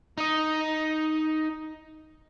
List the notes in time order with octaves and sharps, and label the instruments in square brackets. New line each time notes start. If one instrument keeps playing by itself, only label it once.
[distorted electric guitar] D#4 D#5